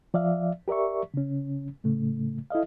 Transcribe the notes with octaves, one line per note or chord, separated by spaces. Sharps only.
F3 D5 E5 F5
G4 A#4 D5 E5 C#6
C#3 C#4
A2 C#3 A3
E4 A4 D#5 F5